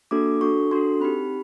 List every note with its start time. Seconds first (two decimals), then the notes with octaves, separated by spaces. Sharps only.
0.11 A#3 D4 F#4 A4 D6
0.41 D4 F#4 A4 C#6
0.71 D4 F#4 A4 C6
1.00 C4 D#4 G4 B5